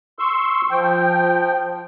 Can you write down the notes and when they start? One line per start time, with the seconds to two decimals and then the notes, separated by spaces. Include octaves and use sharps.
0.19 C6 C#6 E6
0.71 F3 G5